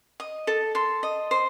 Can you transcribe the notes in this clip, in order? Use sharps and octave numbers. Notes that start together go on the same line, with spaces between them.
D#5
A4
A4 C6
D#5
C5